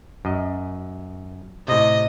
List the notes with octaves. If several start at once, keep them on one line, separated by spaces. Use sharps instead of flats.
F#2 D#5
A2 C3 D#5